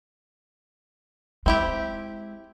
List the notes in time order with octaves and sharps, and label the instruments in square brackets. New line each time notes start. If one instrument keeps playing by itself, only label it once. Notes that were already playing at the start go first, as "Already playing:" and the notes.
[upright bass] G#3 [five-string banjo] C4 E4 G4